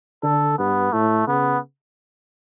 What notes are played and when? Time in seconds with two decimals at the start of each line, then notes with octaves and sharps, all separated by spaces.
0.23 D3 A4
0.58 G2 B3
0.93 A2 A3
1.27 C#3 B3